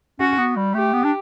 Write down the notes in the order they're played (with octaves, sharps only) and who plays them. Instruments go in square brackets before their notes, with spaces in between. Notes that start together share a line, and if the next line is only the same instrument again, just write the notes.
[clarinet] C#4 [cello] F#4
[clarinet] B3
G3
[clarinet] A3 [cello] G4
[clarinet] B3
D4